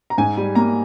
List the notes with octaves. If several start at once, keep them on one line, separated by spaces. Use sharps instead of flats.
A#5
G#2 G#5
G3
A#3 A#5